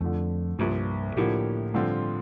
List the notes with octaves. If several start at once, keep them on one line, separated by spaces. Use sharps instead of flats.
F2 D3 F3 A3
C2 G2 A#2 F3
A2 D3 F3 A#3 E4 G4
G2 D3 F3 C4 F4